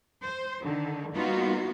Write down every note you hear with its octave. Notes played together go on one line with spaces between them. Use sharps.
C5
D3 D#3
G3 A#3 B3 D#4 F4 F#4